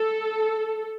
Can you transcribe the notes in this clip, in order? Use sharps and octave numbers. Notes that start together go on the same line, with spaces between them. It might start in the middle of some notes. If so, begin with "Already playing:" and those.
Already playing: A4